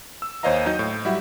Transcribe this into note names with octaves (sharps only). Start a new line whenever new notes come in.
E6
D#2 C5 C#5 D#5 F5 A#5
F#3 D#4 D#5 G6
A2
F#3 G3 E4 E5 F#5